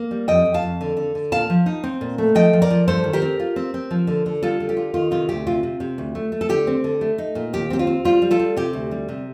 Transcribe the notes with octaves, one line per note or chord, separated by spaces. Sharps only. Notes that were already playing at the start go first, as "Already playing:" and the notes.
Already playing: A#3
G3
F2 D#5 G5
F2
F5 A5
F2
D3
D3
D3
A#2 F5 A5
F3
D#4
C4
A#2
A3
F3 D#5 G5
F3
A#4 D5
F3
G2 A4 C5
D#3
G4 A#4
C4
F4
C4
C4
F3
D3
D3
G3 F4 A4
D3
G4
F4
D#3 F4
C3 F4
D2 G4
C3 F4
C3
C3
D2
A3
A3
A4
D3 G4
C4
D3
A3
D#4
A#2
D#2 G4
C4 G4
F4
C4
G3 F4
G3
F4 A4
G3
C3 G4
D2
G3
C3